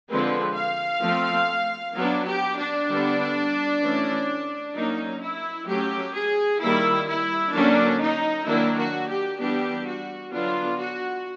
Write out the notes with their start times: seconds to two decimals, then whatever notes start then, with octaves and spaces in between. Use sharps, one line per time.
0.08 D3 F3 G#3 C4 B4
0.55 F5
1.02 F3 A3 C4
1.95 F#3 B3 D4
2.26 G4
2.57 D4
2.88 D3 G3 B3
3.81 E3 A3 C#4
4.74 F#3 A#3 C#4 D#4
5.21 E4
5.67 F#3 A3 C#4 G4
6.14 G#4
6.60 D#3 G3 A#3 E4
7.07 E4
7.53 D3 F#3 A#3 C#4 D4
8.00 D#4
8.46 D#3 F#3 A#3 D4 E4
8.77 F#4
9.08 G4
9.39 E3 G3 B3 D4 G4
9.86 F#4
10.32 D3 F#3 B3 D4 F4
10.78 F#4